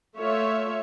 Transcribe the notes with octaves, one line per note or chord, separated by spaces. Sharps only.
A3 F4 C#5 E5